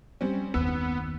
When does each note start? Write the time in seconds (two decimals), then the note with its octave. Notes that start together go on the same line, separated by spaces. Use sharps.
0.21 G3 C4 C#4
0.54 F#1 D#2 B3 E6